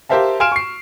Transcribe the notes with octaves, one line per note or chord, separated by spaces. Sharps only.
G4 A#4 C5 E5 F5 A5
F5 G#5 C6 F6 D7 E7
C#6 C7